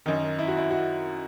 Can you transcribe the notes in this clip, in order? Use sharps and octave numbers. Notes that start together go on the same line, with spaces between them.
F#2 D#3 D#4
E4
F#4
E4
F#4